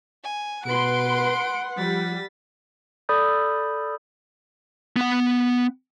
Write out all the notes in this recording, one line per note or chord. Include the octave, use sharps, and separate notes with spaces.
G#5
B2 B4 F#5 C6 D7
F3 G3 A6 B6
A4 D5 B5 D#6 G6
B3 F#5